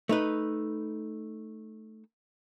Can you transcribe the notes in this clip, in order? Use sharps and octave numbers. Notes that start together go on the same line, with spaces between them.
A3 D#4 B4